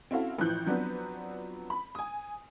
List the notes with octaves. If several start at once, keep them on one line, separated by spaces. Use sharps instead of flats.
C4 C#4 E4 F#4 A4 F5
A1 E3 F3 F#6 G6
F3 F#3 B3 C4 D4 B4
B5
G#5 D#6